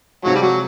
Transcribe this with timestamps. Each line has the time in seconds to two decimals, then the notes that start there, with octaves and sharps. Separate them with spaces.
0.23 C3 F3 F#3 G#3
0.35 G3
0.42 F#3